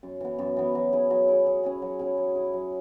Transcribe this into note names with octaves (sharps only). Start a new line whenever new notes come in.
F#2
E3 B3
F#2
E3 B3
F#3
E4 G#4
F#3
E4 G#4
F#3
C#4 E4 G#4
F#3
C#4 E4 G#4
F#3
E4 G#4
F#3